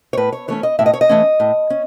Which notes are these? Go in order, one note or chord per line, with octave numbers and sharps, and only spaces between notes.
C#5
A2 B4
C#5
E3 A3 C#4 C#5
D#5
A2 E5
D#5
C#5
D#5
E3 A3 C#4
A2
C#4